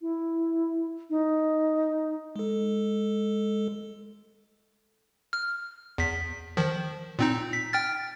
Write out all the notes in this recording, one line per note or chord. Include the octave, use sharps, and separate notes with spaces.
E4
D#4
G#3 A4
F6
E2 B6
D#3 F3
A#2 C4 D#4
B6
G5 F6 A6